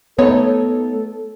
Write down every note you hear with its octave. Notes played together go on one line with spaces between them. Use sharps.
F#3 A3 B3 D#4 A4 C#5